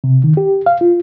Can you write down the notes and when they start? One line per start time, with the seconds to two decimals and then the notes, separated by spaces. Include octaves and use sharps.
0.04 C3
0.24 D#3
0.37 G4
0.66 F5
0.81 F4